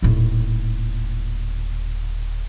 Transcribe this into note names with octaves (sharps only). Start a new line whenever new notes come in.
D#1 A2